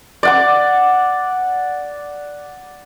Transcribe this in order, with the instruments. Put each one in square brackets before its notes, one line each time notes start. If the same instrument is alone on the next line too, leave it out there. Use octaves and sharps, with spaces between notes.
[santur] D5 F#5 D6